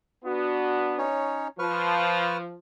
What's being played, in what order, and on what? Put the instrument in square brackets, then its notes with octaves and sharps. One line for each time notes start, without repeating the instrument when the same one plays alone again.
[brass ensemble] B3 D4 F#4
[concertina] C#4 D#4 C#5
[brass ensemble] F3 [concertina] B4 C#6 F6